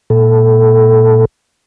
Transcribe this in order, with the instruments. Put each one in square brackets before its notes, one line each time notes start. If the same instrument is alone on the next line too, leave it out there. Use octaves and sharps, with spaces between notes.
[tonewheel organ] A#2 A4